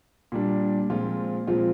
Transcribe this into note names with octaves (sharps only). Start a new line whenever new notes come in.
A#2 G3 D4
A#2 F3 G#3 C4 F4
A#2 F3 G#3 C4 F4